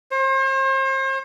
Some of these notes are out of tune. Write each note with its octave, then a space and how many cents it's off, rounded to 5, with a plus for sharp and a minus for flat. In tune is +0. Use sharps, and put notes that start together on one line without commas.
C5 +40